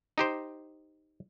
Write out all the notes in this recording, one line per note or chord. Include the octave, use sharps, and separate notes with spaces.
D#4 G4 C5